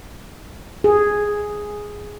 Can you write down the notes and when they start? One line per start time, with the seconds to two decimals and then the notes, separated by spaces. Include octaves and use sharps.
0.84 G#4